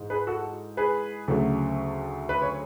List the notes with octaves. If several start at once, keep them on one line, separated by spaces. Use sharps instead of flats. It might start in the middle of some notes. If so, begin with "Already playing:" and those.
Already playing: G#2 E3
G#4 B4
F#4 A4
G#4 B4
D2 C#3 F#3 A3
B4
C#5